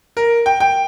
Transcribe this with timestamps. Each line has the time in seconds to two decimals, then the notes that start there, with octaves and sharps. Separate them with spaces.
0.17 A#4
0.46 G5
0.60 G5